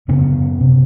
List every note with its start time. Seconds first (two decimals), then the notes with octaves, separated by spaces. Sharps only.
0.08 F#2 C#3 B3 C#4
0.60 C3